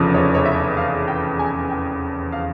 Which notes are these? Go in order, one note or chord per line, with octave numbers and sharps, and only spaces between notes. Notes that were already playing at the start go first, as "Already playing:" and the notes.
Already playing: F1 E2 C#3 F3
C#5
C#5
E5
F5
G5
G#5
G5
F5